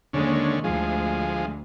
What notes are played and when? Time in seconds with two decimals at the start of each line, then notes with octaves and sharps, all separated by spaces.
0.13 D#2 D3 G#3 C#4
0.64 D2 F3 G#3